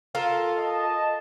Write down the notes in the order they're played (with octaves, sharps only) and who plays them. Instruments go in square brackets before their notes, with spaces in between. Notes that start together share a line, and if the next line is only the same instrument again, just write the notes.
[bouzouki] F4 A4 A#4
[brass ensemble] D#5 A5